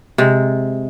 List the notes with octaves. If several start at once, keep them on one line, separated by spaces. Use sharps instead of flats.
C3 G#3